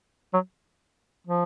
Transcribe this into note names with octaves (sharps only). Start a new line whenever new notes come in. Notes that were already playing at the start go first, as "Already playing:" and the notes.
F#3
F3